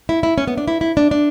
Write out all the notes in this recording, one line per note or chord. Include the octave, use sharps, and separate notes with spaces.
E4
E4
C#4
B3
D4
E4
E4
D4
D4